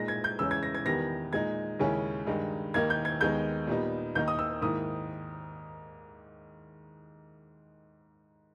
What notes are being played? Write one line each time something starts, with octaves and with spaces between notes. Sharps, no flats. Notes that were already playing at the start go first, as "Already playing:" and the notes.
Already playing: A#2 G#3 D#4 A#6
G#6
G6
E2 C#3 G#3 C#4 E6
G#6
A#6
G#6
E2 D#3 G3 B3 A#6
A#2 G#3 D#4 G#6
D#2 C#3 G#3 C#4 E4
G2 D#3 G#3 D#4
D#2 D#3 A#3 D#4 G#6
G6
G#6
D#2 D#3 G#3 B3 D#4 G6
A#2 G3 B3 D#4
D#2 D#3 A#3 D#4 G6
D#6
E6
G#2 D#3 A#3 E4 D#6